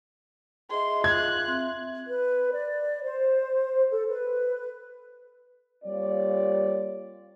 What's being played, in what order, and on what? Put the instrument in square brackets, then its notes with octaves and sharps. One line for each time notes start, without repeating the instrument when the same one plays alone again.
[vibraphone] G#4 D#5 E5 [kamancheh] C6
[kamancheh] F4 F#6 [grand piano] G#6
[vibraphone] C4 E5 C6
[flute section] B4
D5
C5
A4
B4
[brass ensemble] G3 A#3 C4 F4 C#5 D5